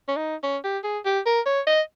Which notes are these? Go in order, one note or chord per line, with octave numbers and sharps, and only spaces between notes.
C#4
D#4
C#4
G4
G#4
G4
A#4
C#5
D#5